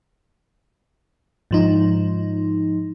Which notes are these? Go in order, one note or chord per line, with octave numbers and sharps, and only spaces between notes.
G#2 F3 D#4